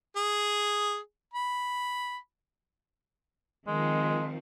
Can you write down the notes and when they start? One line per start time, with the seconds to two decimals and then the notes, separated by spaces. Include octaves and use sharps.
0.16 G#4
1.34 B5
3.67 D#3 F3 G#3 C4